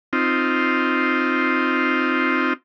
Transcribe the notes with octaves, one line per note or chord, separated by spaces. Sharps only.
C4 D#4 F4